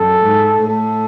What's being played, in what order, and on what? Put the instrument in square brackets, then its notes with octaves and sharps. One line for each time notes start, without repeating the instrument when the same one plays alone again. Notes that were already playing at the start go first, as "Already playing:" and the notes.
Already playing: [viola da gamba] F#2 [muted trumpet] A4
[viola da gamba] G#2
[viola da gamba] A2 [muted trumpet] A4